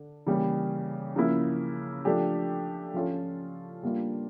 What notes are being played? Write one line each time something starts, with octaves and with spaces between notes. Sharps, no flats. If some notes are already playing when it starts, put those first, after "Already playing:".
Already playing: D3 D4
C#3 E3 G3 A#3 C#4
C#3 F3 A#3 E4
F3 A3 D4 G4
F3 C#4 F4 A4
G3 A#3 D4 F4